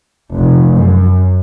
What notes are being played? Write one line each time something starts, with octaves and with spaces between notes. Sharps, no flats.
F1
F#2